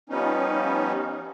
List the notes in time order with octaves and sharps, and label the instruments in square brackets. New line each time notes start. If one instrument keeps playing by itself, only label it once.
[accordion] F3 G3 B3 C#4 D#4